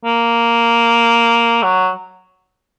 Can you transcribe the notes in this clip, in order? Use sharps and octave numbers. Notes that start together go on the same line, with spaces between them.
A#3
F#3